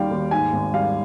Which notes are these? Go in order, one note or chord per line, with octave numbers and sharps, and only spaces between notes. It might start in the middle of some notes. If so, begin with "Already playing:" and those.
Already playing: D#2 D#3 G3 F5 G5
D#2
G#2 G#5
G#1
G3 F5